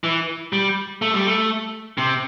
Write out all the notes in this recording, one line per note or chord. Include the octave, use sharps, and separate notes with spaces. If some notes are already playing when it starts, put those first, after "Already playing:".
E3
G3
A3
G3
A3
C3